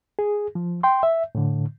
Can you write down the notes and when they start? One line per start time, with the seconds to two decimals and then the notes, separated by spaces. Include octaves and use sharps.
0.19 G#4
0.55 F3
0.83 G5 C6
1.03 E5
1.35 A2 D3